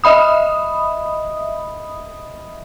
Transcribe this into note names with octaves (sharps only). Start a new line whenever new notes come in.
D#5 E5 B5 D#6